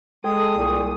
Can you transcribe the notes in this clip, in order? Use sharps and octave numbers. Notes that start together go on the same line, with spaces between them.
G#3 G#4 A4 G5 D#6
C2 A#2